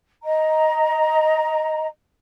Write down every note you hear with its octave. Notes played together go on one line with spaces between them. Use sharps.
D#5 A#5